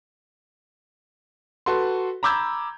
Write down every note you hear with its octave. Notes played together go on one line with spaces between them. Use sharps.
F#4 A4 B4 C6
A#5 B5 D6 E6 G6 G#6